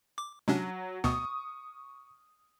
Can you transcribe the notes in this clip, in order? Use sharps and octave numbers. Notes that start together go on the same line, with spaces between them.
D6
C3 F#3 C#4 D4
D2 B2 B3 C#6 D#6